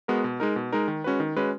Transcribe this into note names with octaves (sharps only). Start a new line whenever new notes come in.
G#3 B3 F#4 A#4
B2
G#3 D#4 A#4
B2
G#3 D#4 A#4
D#3
G#3 C#4 F#4 B4
D#3
G#3 C#4 F#4 B4